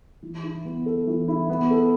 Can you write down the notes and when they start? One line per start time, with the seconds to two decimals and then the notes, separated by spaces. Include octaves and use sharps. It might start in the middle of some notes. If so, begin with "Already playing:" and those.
0.23 E3
0.43 E4
0.65 B3
0.86 A4
1.07 E3
1.28 E4
1.49 B3
1.71 A4